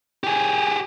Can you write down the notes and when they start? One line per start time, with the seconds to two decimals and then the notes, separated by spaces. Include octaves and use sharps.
0.24 G4 G#4